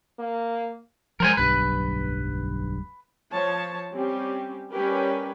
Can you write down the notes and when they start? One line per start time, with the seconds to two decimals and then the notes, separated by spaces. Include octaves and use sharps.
0.19 A#3
1.20 F3 G#3 A#4 C5 G#5
1.37 D1 B1 G2 B4
3.32 F3 C#5 A5
3.93 G3 C4 C#4 G4
4.71 G3 C#4 G4 A#4 B4